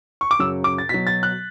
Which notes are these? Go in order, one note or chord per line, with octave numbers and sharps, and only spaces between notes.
C#6
D6
F#2 C#3 F#3 E6
D6
A6
B2 F#3 B6
A6
F#6